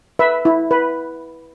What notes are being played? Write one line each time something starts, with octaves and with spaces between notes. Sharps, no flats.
B4 E5
E4
B4